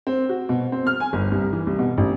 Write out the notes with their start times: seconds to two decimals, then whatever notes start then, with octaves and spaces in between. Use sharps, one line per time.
0.07 C4
0.29 F#4
0.49 B2
0.72 C4
0.87 F6
1.00 G#5
1.13 G1
1.32 C2
1.53 E3
1.67 C2
1.79 B2
1.98 A1